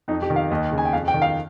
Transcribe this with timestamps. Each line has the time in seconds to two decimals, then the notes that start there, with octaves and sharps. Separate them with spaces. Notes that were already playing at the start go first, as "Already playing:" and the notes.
0.08 F2 D#4
0.22 G4
0.30 D#3
0.36 F5
0.50 D#2 D#5
0.72 C#3
0.78 G#5
0.85 G5
0.93 F2 F5
1.08 G5
1.14 D#3
1.22 F5